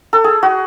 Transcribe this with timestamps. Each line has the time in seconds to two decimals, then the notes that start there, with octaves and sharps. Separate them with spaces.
0.13 A4
0.24 G#4
0.43 F#4